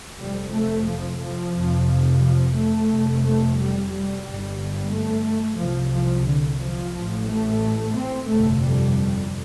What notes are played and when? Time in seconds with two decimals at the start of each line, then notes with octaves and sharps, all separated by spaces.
0.19 F1 F2 C3 G3
0.54 A3
0.87 F3
1.21 F3
1.54 F1 F2 C3
2.22 F3
2.55 A3
2.90 F1 F2 C3
3.24 A3
3.58 G3
3.91 G3
4.25 G1 G2
4.92 A3
5.59 C2 C3 F3
5.94 F3
6.27 D3
6.61 F3
6.95 A1 A2
7.29 A3
7.96 C4
8.30 G1 F2 C3 A3
8.64 G3